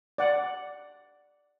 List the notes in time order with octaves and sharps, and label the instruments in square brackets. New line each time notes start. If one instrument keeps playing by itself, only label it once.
[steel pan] D5 F#5